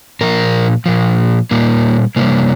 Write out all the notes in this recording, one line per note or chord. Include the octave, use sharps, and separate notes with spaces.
A#2 F3 A#4
A#2 F3
A#2 G3 A#3
C3 G3 A#3